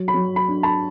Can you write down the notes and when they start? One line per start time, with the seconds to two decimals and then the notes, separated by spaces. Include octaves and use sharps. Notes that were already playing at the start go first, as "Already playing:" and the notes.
Already playing: F#3
0.08 B5
0.14 F#3
0.36 B5
0.48 D4
0.63 A5 B5